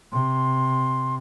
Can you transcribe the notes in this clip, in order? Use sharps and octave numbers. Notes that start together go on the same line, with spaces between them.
C3 C6